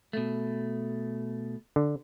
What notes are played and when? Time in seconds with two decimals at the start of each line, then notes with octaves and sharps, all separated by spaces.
0.13 B2 A3
1.76 D3